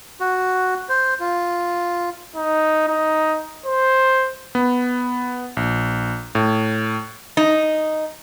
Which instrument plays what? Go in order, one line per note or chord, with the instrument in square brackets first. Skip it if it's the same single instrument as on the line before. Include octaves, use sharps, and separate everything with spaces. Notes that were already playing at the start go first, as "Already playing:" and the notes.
[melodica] F#4
C5
F4
[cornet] D#4
D#4
C5
[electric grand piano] B3
A#1
A2
[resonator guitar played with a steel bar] D#4